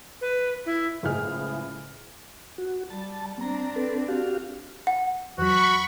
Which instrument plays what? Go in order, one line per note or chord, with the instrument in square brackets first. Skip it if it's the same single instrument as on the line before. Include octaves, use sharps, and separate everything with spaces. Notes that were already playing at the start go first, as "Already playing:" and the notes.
[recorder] B4
E4
[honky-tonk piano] F#1 C#2 A2 G#3 G#4 F6
[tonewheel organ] F#4
[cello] G3 [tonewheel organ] A5
[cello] C4 D4 [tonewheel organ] A#5
[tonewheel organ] A4 B4
F#4 G4 F5
[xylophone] F#5
[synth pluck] E2 F#3 [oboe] F#4 [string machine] B5 C#6